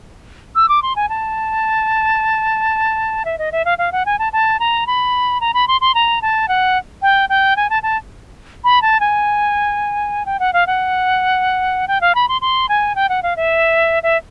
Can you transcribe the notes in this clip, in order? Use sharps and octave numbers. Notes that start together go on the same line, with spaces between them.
E6
D6
C6
G#5
A5
E5
D#5
E5
F5
F5
F#5
G#5
A5
A5
A#5
B5
A#5
B5
C6
C6
A#5
A5
F#5
G5
G5
G#5
A5
A5
B5
A5
G#5
G5
F#5
F5
F#5
G5
F5
B5
C6
C6
G#5
G5
F#5
F5
E5
E5